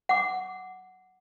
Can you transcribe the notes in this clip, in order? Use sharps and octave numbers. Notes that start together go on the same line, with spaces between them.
F#5 D6